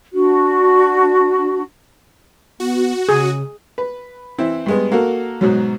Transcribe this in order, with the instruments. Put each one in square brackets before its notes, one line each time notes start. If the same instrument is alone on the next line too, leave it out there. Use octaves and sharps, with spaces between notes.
[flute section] D4 F#4
[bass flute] B3 [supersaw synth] F#4
[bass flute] C#3 [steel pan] G#4
[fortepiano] B4
E3 C4 E4
G2 G#3 B3
A#3 F#4 A4 A#4
G#2 B2 F#3